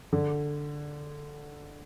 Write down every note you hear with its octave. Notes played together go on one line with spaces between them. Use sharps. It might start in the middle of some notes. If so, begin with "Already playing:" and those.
D3